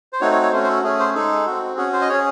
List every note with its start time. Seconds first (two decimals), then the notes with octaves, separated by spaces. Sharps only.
0.13 C5
0.21 A3 C4 D#4 F#4 C#5
0.32 C#5
0.42 C#5
0.52 A3 C#4 F#4 C5
0.64 C5
0.68 A4
0.83 A3 C#4 G#4
0.99 C5
1.14 G#3 D#4 G#4 A4
1.47 C4 F#4
1.77 C#4 F#4 G#4
1.93 C5
2.01 D#5
2.08 C#4 G#4 C#5